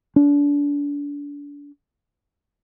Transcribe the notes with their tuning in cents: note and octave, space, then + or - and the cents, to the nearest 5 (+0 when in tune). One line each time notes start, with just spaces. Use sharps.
D4 -30